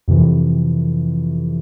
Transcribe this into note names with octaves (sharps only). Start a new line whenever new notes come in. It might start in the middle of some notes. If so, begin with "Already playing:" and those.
F2 C3 E3